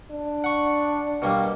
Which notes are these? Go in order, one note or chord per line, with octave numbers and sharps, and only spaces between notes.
D4
F#5 C#6
B2 G3 A#3